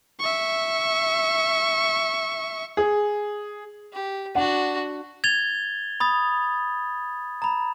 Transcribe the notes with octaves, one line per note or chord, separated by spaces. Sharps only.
E5 C#6
G#4
G4
D4 F#4 F#5
G#6 A6 F7 G7
B5 D#6 A6
A#5 B5